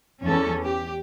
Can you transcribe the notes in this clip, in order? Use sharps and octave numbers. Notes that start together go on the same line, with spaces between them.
E2 E3 C#4 A4
G4